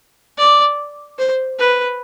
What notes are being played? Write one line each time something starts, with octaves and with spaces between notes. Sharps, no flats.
D5
C5
B4